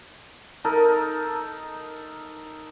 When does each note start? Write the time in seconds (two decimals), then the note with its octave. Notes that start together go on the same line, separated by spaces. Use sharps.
0.64 D#4 A4 A#4